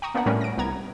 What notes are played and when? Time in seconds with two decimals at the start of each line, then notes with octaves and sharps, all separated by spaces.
0.02 G5 A#5 C#6 D#6
0.14 A#3 B3 D4 B4 F#5 A#5
0.26 A2 G3 A3 C#4 A#4 B4
0.41 A#6 D7
0.58 C2 B3 A#5 G#6